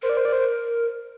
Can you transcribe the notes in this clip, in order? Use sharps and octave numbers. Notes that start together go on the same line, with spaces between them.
A#4 C5
D5
C5
D5
C5